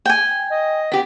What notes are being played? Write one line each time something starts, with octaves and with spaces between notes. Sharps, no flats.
G5 G#5
D#5
B3 G4